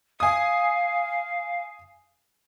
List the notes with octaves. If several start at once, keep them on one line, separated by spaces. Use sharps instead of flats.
F5 G#5 D#6